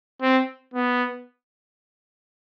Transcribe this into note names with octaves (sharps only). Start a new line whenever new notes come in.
C4
B3